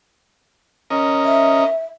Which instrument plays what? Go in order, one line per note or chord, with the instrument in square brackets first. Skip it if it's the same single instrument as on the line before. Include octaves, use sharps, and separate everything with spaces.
[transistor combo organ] C#4 A#4 D#5
[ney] E5